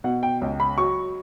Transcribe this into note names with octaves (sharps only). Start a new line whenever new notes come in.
B2 F#5
G5
C#2
B5
F#3 C#6